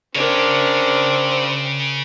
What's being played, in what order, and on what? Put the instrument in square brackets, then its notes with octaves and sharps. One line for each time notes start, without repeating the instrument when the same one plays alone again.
[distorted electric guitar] C#3 C#5 [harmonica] C4 [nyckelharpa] D4 A#4